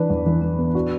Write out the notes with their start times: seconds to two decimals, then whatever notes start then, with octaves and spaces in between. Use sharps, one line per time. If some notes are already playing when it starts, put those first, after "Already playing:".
Already playing: E3 D4 B4
0.10 E2
0.26 E3
0.42 E3
0.58 B3
0.75 D4 F#4